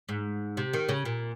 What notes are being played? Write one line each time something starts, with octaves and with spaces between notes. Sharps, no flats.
G#2
C3
D#3
C#3
A#2